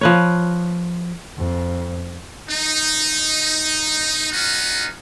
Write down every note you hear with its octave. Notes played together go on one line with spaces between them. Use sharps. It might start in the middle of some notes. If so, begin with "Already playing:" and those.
F3 B4 C#5
F2
D#4
C#4 D#4 F4 F#4